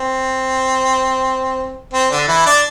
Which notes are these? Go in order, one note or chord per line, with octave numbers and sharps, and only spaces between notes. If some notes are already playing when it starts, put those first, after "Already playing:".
Already playing: C4
C4
D3 D4
E3 E4
D4 D5